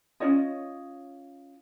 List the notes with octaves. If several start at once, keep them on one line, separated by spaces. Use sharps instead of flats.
C#4 F4 C#5 D#5